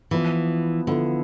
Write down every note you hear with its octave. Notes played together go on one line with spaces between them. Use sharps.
E3 F3 B3 E4
D3 F3 B3 E4